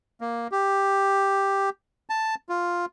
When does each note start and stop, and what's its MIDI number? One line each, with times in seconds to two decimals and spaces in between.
0.21 0.48 58
0.51 1.70 67
2.10 2.35 81
2.49 2.86 65